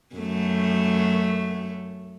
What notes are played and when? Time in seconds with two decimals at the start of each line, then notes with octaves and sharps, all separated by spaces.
0.15 F#2 A3